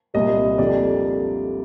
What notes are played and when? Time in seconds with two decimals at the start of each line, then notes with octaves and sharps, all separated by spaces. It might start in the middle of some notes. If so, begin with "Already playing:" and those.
0.14 C2 A#2 G3 D#5
0.58 F2 D3 G3 A#3 D5